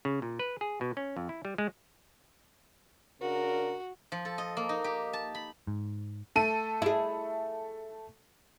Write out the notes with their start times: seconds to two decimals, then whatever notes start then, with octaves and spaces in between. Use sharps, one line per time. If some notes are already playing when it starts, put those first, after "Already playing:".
0.05 C#3
0.22 A#2
0.39 B4
0.61 G#4
0.81 B2
0.97 C#4
1.17 F2
1.29 E4
1.45 G3
1.58 G#3
3.21 C#3 D4 F#4 A#4
4.12 F3
4.25 A4
4.38 D#5
4.57 A#3
4.69 D#4
4.84 G4
5.13 A5
5.35 B5
5.67 G#2
6.36 A3 A4 D#7
6.82 E4 G#4